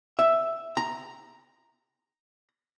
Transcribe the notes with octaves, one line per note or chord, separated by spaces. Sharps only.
E5
A#5